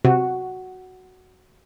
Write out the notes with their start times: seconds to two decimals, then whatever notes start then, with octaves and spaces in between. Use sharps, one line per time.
0.05 C3 F#4